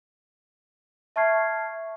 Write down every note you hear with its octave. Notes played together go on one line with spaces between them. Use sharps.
E5 A5 C#6 F6 G#6 C7